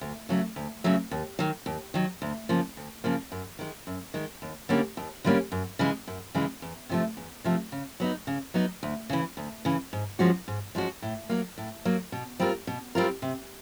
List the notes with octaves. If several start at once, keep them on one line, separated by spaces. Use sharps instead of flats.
D2
C#3 F#3 A3
D2
C#3 F#3 A3
D#2
D#3 F#3
D#2
D#3 F#3
D2
C#3 F3 A#3
D2
C#3 F3 A#3
F#2
D#3 G#3
F#2
D#3 G#3
D#2
D3 G3 A#3 C#4
D#2
D3 G3 A#3 C#4
F#2
C#3 E3 G#3
F#2
C#3 E3 G#3
E2
C3 F3 A3
E2
C3 F3 A3
C#3
F#3 B3 D#4
C#3
F#3 B3 D#4
D2
C#3 E3
D2
C#3 E3
G#2
F3 G#3 C#4 F#4
G#2
F3 G#3 C#4 F#4
A2
F#3 A#3
A2
F#3 A#3
B2
G3 C4 F4 A#4
B2
G3 C4 F4 A#4
C3